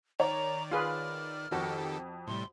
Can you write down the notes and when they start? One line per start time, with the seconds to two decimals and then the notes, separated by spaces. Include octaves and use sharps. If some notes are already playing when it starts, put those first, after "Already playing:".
0.20 D#3 C#5 D5 A#5
0.71 F4 G#4 B4 F6
1.52 F2 D#3 F#4 G4 A4
2.27 A2 C3 G3 C6